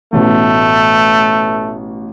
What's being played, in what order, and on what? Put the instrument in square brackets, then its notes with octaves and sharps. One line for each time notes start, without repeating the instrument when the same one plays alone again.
[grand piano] A1 B2 [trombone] A3